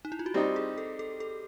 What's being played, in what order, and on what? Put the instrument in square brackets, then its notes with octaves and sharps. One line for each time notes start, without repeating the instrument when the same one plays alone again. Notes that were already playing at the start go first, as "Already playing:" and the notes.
[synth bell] D#4
E4
F4
F#4
[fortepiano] G3 C4 D#4 [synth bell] G4
[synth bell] G#4
A4
A4
A4